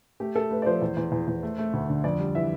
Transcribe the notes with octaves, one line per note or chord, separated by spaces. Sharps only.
A3 G4
A3 A4
A3 B4
D5
F3 C5
E2
E2
E2
E2
A3
A3
D2
D3
F2 D5
G3
E3 E5